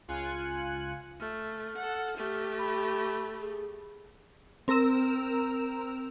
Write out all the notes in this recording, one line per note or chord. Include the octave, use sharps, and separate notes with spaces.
C#2 F4 G#5 F#6 C#7
A3 F6
A4 F#5
A3 G4
B5
G#4
C4 A#4 A#5 E6 E7